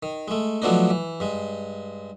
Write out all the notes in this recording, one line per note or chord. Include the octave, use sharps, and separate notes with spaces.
D#3
G#3 A3
F3 F#3 A3 B3 D4 D#4
E3
G2 G#3